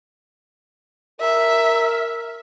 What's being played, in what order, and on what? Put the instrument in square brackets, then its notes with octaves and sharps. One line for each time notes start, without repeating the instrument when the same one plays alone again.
[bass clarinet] A#4 [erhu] E5